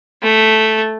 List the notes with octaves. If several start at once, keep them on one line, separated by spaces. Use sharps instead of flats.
A3